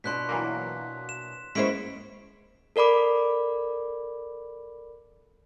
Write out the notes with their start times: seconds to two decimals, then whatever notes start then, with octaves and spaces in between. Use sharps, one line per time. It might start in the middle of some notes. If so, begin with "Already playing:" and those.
0.04 B2 D4 F4 C6 F#6 B6
0.29 E3 F#3 A#3
1.09 E7
1.55 G#3 A#3 B3 C#4 E4 C5 B6 D7
2.76 A4 A#4 D5 B5 D6